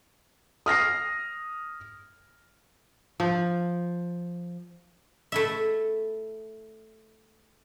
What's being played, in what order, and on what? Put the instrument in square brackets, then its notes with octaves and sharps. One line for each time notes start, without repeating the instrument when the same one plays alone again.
[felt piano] D#6 F6 A#6 C7
[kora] F3
[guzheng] A3 E4 E5